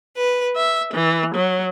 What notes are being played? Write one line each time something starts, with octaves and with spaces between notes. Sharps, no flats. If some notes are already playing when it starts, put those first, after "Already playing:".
B4
E5
E3
F#3